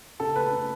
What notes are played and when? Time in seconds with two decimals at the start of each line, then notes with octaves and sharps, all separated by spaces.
0.20 C#3 A4
0.36 A3 B4
0.51 C#3